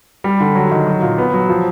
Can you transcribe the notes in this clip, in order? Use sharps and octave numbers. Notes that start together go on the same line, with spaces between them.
G3
D3
F#3
D#3
F#3
A#2
B3
F#3
F3